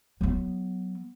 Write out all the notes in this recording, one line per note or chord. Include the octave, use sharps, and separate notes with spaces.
F#3 B3